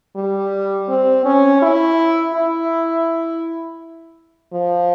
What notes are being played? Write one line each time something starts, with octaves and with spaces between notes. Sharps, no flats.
G3
C4
C#4
E4
E4
F3